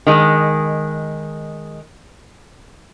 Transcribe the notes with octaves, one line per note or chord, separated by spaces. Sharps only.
D#3 G#3